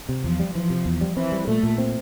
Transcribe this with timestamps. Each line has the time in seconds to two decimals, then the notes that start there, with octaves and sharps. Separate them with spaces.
0.09 C3
0.24 E2 F3
0.40 G3
0.55 E3 F3
0.70 C3
0.85 E2
1.01 G3
1.17 E3 C4
1.32 G3
1.47 A#2 A3
1.63 A#2
1.78 C4